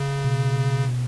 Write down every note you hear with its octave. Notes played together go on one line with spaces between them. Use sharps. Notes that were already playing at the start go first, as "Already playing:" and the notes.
Already playing: C#3
B2